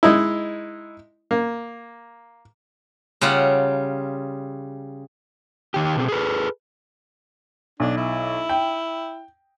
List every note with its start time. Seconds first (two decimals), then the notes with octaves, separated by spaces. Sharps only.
0.03 G#3 D#4 E4
1.31 A#3
3.21 C#3 G3 F4 F#5 A5
5.74 D#3 G4
5.96 B2 C4 G#4
6.08 G#4 A4 B4
7.80 B1 D4
7.97 E4
8.49 G5